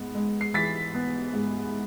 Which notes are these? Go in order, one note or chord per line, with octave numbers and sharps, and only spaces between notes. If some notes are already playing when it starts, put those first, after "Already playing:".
Already playing: G#2 B3
G#3
C7
E3 A6 B6
B3
G#2